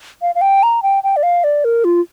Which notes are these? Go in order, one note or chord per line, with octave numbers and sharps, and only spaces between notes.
F5
F5
G5
A#5
G5
G5
D5
F5
D5
A#4
F4